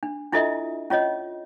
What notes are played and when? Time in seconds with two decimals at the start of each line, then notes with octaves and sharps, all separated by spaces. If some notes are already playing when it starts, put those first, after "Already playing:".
0.03 D4
0.33 D4 E4 F4 A4 D#5 E5
0.90 C#4 F4 C#5 D#5